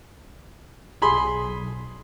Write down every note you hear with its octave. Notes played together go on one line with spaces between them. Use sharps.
B1 G#4 B5 C6